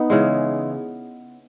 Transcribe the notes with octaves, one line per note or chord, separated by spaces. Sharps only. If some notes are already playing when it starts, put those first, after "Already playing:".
Already playing: B3 D#4
C#3 E3 G#3